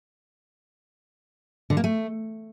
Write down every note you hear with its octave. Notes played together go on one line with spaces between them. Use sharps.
D3
A#3
A3